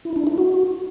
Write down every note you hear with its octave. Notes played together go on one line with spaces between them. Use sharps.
E4
D4
E4
F#4